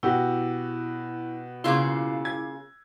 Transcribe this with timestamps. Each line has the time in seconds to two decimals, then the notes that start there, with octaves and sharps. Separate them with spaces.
0.03 B2 E4 F#4 G4
1.64 C#3 A#3 E4 F4 D6
2.25 G#6